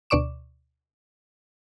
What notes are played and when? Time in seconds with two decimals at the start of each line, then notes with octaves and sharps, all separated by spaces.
0.10 D2 B2 D5 C#6 D6 E7